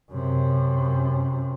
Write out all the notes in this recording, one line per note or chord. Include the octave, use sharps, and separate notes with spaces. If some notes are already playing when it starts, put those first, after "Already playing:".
F#2 C3